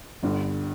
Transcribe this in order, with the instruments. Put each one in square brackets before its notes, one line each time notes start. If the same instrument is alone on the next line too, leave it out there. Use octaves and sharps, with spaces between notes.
[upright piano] G1 G2 D3